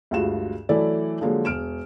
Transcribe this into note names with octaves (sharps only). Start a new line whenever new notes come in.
D2 G2 G#3 F4 F#4 E7
E3 F#3 A3 E4 A4 D5
D3 F3 F#3 G#3 A#3
E1 F6 D7 E7